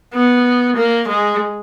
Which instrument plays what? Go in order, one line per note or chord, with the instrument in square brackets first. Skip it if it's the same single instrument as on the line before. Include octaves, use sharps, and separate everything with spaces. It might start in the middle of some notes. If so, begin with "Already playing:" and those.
[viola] B3
A#3
G#3